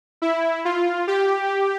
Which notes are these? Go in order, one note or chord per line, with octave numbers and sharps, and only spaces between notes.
E4
F4
G4